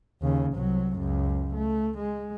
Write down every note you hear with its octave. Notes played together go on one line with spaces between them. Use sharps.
D#2 C#3
C2 F#3
C#2 F#2
A3
G#3